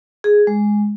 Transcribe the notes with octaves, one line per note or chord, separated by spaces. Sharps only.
G#4
G#3